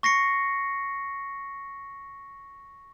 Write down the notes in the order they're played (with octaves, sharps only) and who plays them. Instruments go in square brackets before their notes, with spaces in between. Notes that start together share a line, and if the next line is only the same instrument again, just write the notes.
[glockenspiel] C#6 A#6 C7 C#7